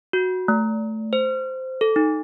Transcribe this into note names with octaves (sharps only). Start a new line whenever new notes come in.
F#4
A3
C5
A4
D#4